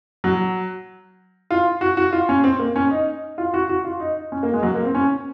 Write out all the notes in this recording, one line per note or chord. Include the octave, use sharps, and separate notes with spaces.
F#3
F4
F#4
F#4
F4
C#4
C4
A#3
C#4
D#4
F4
F#4
F#4
F4
D#4
C#4
A#3
G#3
F#3
A#3
C4
C#4